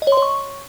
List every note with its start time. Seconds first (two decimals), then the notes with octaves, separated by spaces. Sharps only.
0.02 D#5
0.07 C#5
0.12 C6
0.17 C#5
0.22 C#6